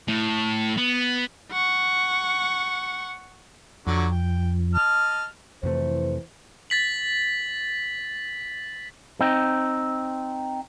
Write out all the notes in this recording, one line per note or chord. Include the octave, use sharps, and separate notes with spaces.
A2
B3
F#5 C#6
F2 D3 F#3 F#4
G5
D#5 A5 F6
F2 C3 E3 A3 C5
A6 B6 F#7
C4 D#4